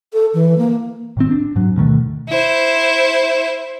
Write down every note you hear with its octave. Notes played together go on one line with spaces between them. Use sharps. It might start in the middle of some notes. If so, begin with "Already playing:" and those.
A4
E3
A#3
A2 D#3 C4
D4
G#2 F#3
D2 B2 D#3 A3
E4 C5